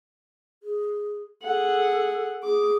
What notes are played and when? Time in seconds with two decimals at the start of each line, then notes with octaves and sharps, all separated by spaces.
0.63 G#4
1.42 G#4 A4 F#5
2.43 G#4 D6